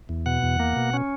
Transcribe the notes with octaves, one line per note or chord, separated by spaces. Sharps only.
E2
B2 F#5
E2
A#3
B2
C#4